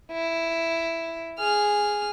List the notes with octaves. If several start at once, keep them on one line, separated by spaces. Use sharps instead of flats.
E4
G#4 F6